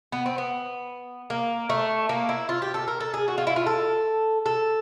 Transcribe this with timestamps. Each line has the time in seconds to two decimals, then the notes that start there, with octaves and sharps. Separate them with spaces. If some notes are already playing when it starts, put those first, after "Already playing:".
0.12 B3
0.26 C4
0.38 B3
1.30 A#3
1.69 A3
2.09 A#3
2.29 E4
2.49 F4
2.62 G4
2.74 A4
2.88 A#4
3.00 A4
3.14 G#4
3.28 F#4
3.38 F4
3.47 E4
3.56 F4
3.66 A4
4.46 A4